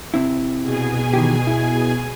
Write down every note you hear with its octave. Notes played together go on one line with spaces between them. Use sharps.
C3 C4 E4
B2 G#4 G#5
D#3 E3 G4
E4